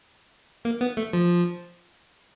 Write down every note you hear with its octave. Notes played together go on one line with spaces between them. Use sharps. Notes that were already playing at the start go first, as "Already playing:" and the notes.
A#3
B3
A3
F3